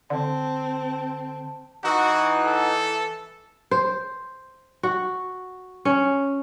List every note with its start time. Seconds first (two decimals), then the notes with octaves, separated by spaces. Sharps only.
0.10 D3 C4 A5
1.84 E3 D#4 F#4 F#5
2.45 A4
3.71 C5
4.83 F#4
5.85 C#4